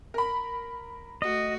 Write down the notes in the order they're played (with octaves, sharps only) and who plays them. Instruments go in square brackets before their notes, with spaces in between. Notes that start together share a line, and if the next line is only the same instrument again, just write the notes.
[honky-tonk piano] A#4 B5
[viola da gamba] A3 F#4 [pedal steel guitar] D#5